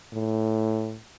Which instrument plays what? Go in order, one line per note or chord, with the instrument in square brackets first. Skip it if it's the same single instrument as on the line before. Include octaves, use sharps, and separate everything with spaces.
[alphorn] A2